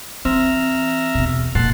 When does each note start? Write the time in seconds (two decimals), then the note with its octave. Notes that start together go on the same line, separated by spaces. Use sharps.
0.25 E3 C4 E5 A#5 F6
1.15 E2 B2
1.55 F1 A#2 F#5 A5 C6